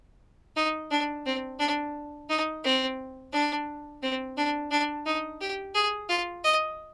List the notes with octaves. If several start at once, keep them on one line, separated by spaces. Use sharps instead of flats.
D#4
D4
C4
D4
D#4
C4
D4
C4
D4
D4
D#4
G4
G#4
F4
D#5